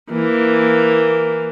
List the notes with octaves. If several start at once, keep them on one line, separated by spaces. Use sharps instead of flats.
E3 A#3